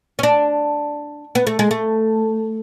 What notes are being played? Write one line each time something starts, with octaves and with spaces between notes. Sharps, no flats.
C#4
D4
B3
A3
G#3
A3